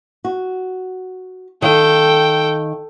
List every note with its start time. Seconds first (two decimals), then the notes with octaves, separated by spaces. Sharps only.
0.25 F#4
1.62 D#3 A4 F5 G5